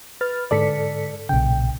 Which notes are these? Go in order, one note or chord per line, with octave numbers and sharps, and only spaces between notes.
B4 F6 A6
G#2 D3 A4 D5 B6 C#7
B1 A#2 C#3 G5